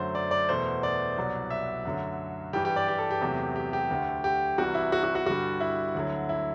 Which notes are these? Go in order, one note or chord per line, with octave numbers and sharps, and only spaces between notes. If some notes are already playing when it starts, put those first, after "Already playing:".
Already playing: F#2 D3 F#3 A3 C5
D5
D5
E2 B2 A3 C5
D5
C2 B2 F#3
E5
F#2 D3 F#3 A3
G2 E3 G3 G4
G4
D5
G4
A4
G4
E2 C3 F#3 A3
G4
G4
D2 D3 A3
G4
C2 C3 E3 G3 F#4
E4
F#4
F#4
F#4
G2 D3 G3 F#4
E4
D2 D3 F#3
E4